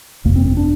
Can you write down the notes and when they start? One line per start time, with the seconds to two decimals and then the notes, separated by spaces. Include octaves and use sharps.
0.25 G1 F2 C3 A#3
0.36 C4
0.46 C4
0.57 D4